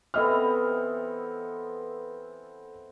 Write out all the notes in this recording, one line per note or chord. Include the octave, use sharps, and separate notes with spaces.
E3 B3 C4 A4 D#5 F6